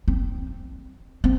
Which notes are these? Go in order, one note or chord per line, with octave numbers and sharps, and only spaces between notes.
C4
C4